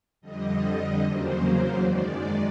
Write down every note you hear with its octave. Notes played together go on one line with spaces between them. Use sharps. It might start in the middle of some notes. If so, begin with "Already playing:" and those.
F2 D3 G3 D#5
E2 C#3 F#3 A#3 C5
F#2 D#3 G#3 D5